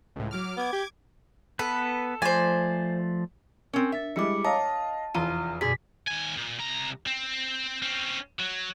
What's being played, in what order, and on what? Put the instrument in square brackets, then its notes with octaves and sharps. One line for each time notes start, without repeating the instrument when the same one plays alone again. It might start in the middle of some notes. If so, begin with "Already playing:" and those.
[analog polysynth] C#2 A2
F#3 D6 F6
[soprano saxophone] B3 [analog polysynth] D6 G#6
[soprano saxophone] G4
[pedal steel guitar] B3 B4 [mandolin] A4
[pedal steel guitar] F3 A3 D5 [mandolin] C5 G#5
[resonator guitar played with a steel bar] C4 C#4 [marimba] A#4
[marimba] D4 A6 [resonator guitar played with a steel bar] E5
[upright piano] G3 G#3 E4 [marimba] D#5 [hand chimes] D6 C#7
[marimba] C#5 A#5 [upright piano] D#5 F5 [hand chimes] A5
[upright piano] F1 E2 D#7 [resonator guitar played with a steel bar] F4
[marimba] F#2 B2 [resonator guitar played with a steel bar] D3 G3 G#4 [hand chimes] B6
[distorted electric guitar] D#2 G#5
A#2
C2 A#5
C4
C4 C#4
F#3